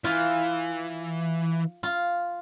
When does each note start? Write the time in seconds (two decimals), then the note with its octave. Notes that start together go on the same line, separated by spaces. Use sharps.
0.04 E3 F4
1.83 F4